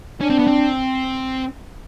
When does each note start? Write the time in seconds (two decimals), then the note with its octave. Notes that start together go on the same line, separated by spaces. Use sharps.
0.21 C#4 D4
0.30 C4
0.39 B3
0.47 C4